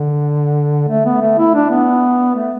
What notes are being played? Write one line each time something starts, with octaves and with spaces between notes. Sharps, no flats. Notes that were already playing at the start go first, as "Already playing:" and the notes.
Already playing: D3
A3
B3
A3
E4
D4
B3
A3